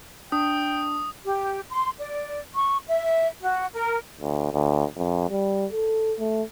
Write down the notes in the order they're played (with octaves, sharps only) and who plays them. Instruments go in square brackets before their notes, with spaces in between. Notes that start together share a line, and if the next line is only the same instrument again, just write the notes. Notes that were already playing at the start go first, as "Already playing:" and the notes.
[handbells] D4 [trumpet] G5 [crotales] D#6
[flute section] G4
C6
D5
C#6
E5
F#4
A#4
[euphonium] D2
D2
F2
G3
A4
A3